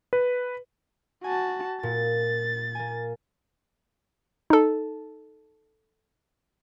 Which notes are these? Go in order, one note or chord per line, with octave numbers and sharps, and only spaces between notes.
B4
F#4 G#5 A5
A#2 A6
A#3 G#5
D#4 A4